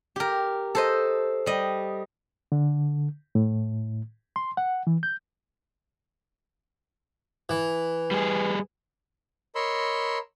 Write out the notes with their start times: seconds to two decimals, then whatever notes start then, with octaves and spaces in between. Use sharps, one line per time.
0.16 G4 A#4
0.75 A4 C5 D#5
1.46 G3 D#5
2.52 D3
3.35 A2
4.36 C6
4.57 F#5
4.87 E3
5.03 G6
7.49 E3
8.11 G3 G#4
9.55 A#4 C#5 D#5 B5 C6 E6